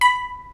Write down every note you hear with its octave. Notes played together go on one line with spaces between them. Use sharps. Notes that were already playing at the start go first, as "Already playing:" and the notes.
B5